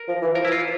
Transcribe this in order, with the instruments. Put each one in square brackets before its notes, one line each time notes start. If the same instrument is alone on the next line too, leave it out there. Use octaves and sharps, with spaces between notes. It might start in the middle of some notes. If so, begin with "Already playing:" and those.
Already playing: [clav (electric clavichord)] A#4
[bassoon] F3
E3
[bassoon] F3 [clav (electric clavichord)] A#4
[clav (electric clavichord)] E4
F4